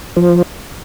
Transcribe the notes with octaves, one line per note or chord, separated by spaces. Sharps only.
F3